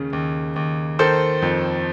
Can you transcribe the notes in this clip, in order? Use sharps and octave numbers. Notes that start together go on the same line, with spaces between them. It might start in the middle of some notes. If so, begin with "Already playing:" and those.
Already playing: D#2 C#3
D#2
D#2
D#3 A4 C5
F2